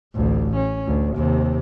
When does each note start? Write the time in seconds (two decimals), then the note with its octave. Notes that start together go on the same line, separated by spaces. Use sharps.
0.14 A1 D2
0.56 C#4
0.87 D2
1.16 D#2 C3